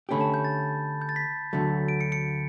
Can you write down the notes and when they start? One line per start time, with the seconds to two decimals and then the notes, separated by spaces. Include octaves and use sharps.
0.09 D3 A3 C#4 G4 B5
0.21 A5
0.34 G6
0.45 A6
1.01 G6
1.09 A6
1.16 B6
1.53 D2 D3 F#3 A3
1.88 D7
2.01 C#7
2.12 C#7